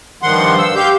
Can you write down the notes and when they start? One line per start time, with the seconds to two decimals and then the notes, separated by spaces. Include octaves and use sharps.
0.22 G2 D#3 F3 F#5 C6
0.59 E6
0.75 G4 F5 G6